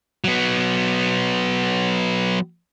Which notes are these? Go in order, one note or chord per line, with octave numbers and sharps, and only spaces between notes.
F#3 B3